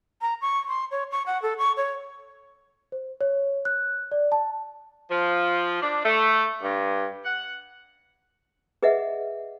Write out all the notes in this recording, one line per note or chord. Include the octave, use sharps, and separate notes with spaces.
A#5
C#6
C6
C#5
C#6
F#5
A4
C#6
C#5
C5
C#5
F#6
D5
A5
F3
D4
A3
G2
F#5
G#4 B4 D#5 E5 F#5